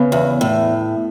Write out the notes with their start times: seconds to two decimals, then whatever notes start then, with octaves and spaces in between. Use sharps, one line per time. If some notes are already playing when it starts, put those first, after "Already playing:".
Already playing: C#3 B3
0.12 E2
0.41 A2